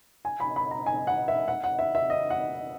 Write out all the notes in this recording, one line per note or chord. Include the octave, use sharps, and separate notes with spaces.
G#5
B5
B5
A#5
G#5
F#5
E5
F#5
F#5
E5
E5
D#5
F#5